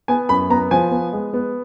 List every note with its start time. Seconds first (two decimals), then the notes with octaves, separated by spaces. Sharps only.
0.08 B3 G#5
0.29 F#2 B5
0.50 B3 A#5
0.71 F3 G#5
0.91 B3
1.13 G#3
1.33 B3